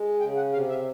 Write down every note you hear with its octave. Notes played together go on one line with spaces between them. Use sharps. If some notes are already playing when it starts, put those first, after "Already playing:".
Already playing: G#3
C#3 G5
F#5
C3 F5
E5